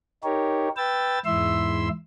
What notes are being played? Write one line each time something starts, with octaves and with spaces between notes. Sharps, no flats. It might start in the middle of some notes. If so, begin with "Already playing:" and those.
D#4 G4 A#4 C#5
B4 G5 E6 A6
E2 G#2 E4 E5 C6 E6